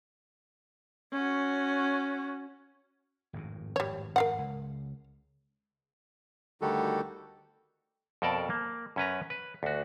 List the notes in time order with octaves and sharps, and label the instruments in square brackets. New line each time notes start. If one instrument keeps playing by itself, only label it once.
[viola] C#4 F#4
[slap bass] G#1 F2 A2
[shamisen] G3 C#5
A#4 F5 F#5
[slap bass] C#2
[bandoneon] D2 D#3 G3 F#4 G4 A4
[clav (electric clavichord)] F2 B2 A4 A#4 D5 A5
A#3
F#2 C#4 B4 A#5
B4
D2 F#4